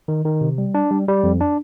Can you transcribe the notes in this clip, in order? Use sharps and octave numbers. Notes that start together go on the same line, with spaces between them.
D#3
D#3
C3
G3
D4
G3
G3
F2
D4